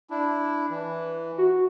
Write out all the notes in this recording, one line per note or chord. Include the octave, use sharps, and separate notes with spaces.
D4 E4
E3
F#4